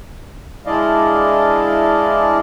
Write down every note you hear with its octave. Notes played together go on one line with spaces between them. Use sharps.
G#3 D4 E4 D5 D#5 F5